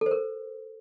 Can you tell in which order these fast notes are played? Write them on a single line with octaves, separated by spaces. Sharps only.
A4 C5 A#4